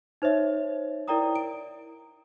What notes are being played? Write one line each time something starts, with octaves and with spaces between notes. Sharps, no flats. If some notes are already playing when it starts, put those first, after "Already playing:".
D#4 C5 C#5 E5
E4 A#4 D5 G5 A#5 D#6
D7